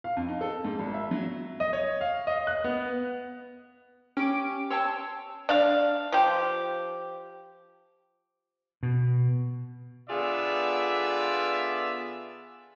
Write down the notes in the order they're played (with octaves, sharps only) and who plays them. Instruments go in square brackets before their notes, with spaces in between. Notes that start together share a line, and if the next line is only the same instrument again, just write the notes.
[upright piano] F5
F2
D#4
A4
G#2
G#1
E5
F#3
[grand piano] D#5
C#5
F5
D#5
F#6
B3
[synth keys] C#4 D7 [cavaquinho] G4 D6
[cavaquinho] C#5 G5 A5 [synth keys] C6 E6
[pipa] D4 F5
F3 G4
[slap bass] B2
[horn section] D3 B3 F4 G#4 D5 E5